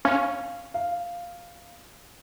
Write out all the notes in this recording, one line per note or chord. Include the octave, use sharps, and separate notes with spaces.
C#4 F5
F5